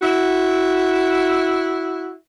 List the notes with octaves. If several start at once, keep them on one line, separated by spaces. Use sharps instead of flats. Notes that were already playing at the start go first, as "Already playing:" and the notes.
E4 F#4